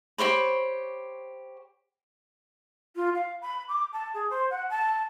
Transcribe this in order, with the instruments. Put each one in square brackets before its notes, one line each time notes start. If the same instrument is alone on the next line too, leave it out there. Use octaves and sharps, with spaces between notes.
[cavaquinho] G4 C5 C#5 B5
[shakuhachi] F4
F5
B5
D6
A5
G#4
C5
F#5
A5